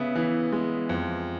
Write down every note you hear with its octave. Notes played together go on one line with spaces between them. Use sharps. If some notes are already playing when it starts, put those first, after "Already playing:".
Already playing: C#3 B3 E5
E3
G#3
F2